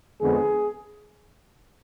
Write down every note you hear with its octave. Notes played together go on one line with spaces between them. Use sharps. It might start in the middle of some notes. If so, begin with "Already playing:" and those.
F2 D3 G#3 B3 G#4